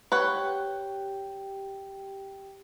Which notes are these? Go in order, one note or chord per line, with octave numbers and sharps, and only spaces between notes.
G4 B4 C#5 F#5 G5